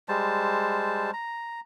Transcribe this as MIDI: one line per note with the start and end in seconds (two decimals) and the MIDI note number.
0.09 1.11 55
0.09 1.11 56
0.09 1.11 72
0.09 1.11 81
1.13 1.60 82